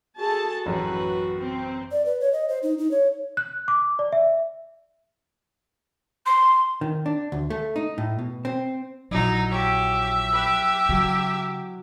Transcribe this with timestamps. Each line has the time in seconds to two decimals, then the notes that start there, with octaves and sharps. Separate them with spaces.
0.18 F#4 G#4 A4 A5
0.66 A1 F#2 B4
1.40 C4
1.91 D5
2.06 B4
2.20 C#5
2.33 D#5
2.49 C5
2.63 D#4
2.78 D#4
2.91 C#5
3.37 F#6
3.68 D6
3.99 D5
4.12 E5
6.26 C6
6.81 D#3
7.06 D4
7.32 D2
7.50 A3
7.76 D#4
7.98 A2
8.19 B2
8.45 C4
9.11 A#1 F3 F#3 D#4 E4
9.51 G4 C#5 E5
10.33 G4 B4 F#6
10.89 C#3 F#3